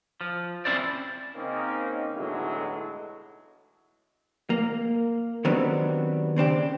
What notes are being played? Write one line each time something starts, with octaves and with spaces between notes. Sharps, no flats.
F3
C4 C#4 E4 C5 D5
C#3 A#3 C4 C#4 D#4
B1 A2 D3 E3 F#3 G#3
A#3
D#3 F#3 G3 B3 C4 D4
C#3 C4 D4 G4